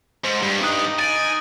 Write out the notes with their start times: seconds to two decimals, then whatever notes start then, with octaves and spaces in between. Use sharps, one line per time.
0.24 G#2 C5
0.42 G2 G3
0.63 D#4 D#6 F#6 F#7
0.99 G#5 A6 D7 F#7